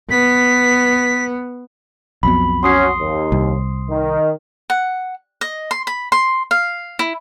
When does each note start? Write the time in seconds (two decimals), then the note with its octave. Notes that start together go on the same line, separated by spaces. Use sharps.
0.11 B3 B6
2.23 B1 F2 B2 B5
2.63 C#4 F#4 C6 D#6 C7
2.99 D#2
3.32 C2
3.90 D#3
4.70 F#5
5.41 D#5
5.71 C6
5.87 B5
6.12 C6
6.51 F5
6.99 E4